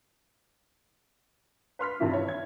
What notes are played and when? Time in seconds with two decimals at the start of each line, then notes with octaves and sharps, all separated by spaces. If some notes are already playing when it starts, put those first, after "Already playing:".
1.79 B4 C6 F6 B6
2.00 G2 C3 D#3 E3 E4 F4
2.12 E4 C#5
2.28 G#6